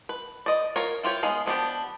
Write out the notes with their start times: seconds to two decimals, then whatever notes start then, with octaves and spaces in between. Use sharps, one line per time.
0.09 B4
0.46 D5 D#5
0.76 F4 A#4 C#5
1.03 E4 F4 G4 C#5
1.23 G#3 B3 D#4 F5
1.46 F3 B3 D4 G4